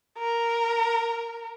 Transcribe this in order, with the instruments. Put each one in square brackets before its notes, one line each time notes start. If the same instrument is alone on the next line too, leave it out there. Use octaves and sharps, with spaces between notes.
[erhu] A#4